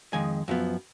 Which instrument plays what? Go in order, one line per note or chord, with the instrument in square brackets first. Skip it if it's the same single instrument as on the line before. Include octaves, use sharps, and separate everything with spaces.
[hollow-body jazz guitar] F2 D#3 G#3 G#5
F#2 F3 B3